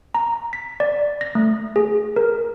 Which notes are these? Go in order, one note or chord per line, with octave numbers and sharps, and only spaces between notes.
A#5
B6
D5
A#6
A3
G#4
A#4